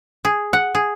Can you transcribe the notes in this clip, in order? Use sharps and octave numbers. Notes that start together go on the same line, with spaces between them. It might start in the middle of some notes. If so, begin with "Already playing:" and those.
G#4
F#5
G#4